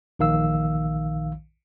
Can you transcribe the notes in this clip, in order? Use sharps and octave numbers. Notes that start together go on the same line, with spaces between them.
A#1 D#3 F5 E6